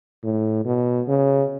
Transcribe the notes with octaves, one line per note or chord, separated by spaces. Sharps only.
A2
B2
C#3